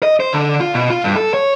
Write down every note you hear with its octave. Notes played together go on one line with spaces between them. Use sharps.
D#5
C5
D3
F4
B2
F4
G2
A4
C#5